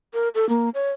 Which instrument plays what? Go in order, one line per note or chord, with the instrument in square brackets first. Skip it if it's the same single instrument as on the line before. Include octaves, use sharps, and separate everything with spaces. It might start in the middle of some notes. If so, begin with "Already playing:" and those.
[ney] A#4
A4
A#3
C#5